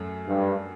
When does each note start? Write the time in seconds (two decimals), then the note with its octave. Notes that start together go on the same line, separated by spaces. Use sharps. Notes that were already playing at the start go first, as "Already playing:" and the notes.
Already playing: F#2 F#3 A3
0.28 G2